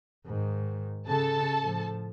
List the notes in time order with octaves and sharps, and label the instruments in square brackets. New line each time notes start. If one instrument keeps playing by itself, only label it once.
[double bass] G#2 D#3
[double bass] C#3 [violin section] A4 A5
[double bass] A2 F3